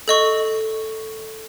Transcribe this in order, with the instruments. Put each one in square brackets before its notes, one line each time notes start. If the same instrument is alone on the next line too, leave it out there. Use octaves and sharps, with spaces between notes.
[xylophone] A4 D#5 C#6